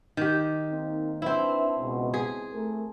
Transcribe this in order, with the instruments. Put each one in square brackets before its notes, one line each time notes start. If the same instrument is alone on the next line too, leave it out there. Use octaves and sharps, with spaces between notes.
[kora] D#3 G4
[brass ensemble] A#3 C4 D#4
[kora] C4 E4 [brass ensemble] D4 B4 E5
[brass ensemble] C#2 B2
[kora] G#4
[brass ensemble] A3 A#4